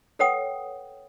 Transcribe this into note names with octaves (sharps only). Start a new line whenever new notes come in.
A4 B4 C#5 F#5 G5 D#6